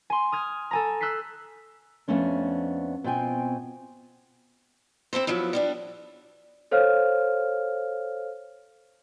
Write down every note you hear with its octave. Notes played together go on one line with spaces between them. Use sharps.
G#5 C6
D#6 F6 G#6
A4 G#5 A#5
E6 F#6 G6 B6 C7
F2 D3 A3 B3 C#4 D4
B2 C4 F4 G5 G#5
C4 E4 A4 C5
F3 F#3 B3 E4
G3 B3 D4
A4 C5 C#5 F5 F6